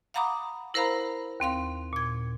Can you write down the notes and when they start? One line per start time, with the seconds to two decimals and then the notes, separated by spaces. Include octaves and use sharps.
0.14 F5 F#5 A#5 B5 D6 D#6
0.74 E4 A#4 C5 F5 A#5 B5
1.40 D#2 C4 F5 C6
1.93 A#2 G#6